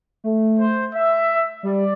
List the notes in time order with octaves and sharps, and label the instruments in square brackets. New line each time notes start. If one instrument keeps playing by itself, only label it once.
[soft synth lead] A3
[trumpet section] C5
E5
[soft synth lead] G3 [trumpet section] D5